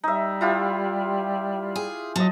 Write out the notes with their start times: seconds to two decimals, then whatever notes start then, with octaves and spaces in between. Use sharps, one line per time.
0.03 G3 D#4 E5
0.41 E4 F4 G4
1.76 G#4
2.16 F#3 D#5 A5